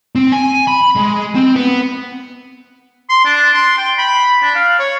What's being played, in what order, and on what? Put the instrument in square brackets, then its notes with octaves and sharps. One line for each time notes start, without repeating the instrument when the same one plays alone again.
[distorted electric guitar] C4
G#5
B5
G#3
C4
B3
[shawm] C6
D4
C6
G5
B5
D4
F5
C#5